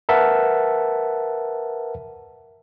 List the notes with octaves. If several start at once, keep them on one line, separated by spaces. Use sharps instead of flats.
A#4 B4 E5 F#5 A5